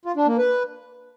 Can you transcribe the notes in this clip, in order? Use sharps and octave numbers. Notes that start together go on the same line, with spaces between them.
F4
D4
A#3
B4